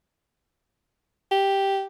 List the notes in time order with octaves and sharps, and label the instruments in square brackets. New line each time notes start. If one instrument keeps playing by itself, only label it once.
[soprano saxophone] G4